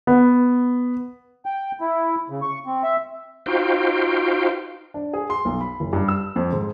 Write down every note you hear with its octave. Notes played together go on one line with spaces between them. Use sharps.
B3
G5
E4
C#3
C#6
C4
E5
D#4 F4 F#4 C5 F5 G5
D4
G#4
C6
B1
B5
F#1
G2
E6
F2
G#2